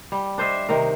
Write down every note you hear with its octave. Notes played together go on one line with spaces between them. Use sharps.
G3
D4 C5 D#5 E5
C3 D#3 A#4